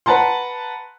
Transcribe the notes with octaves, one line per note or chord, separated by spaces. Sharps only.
B4 F#5 A5 A#5 C6